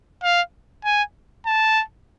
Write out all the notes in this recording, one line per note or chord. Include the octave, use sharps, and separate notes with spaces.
F5
G#5
A5